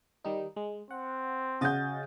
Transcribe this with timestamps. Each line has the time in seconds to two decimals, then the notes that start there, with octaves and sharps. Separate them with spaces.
0.24 D#3 G3 D#4
0.56 G#3
0.91 C4 F#5
1.61 C#3 F#4 D#5 F#5 G6 A6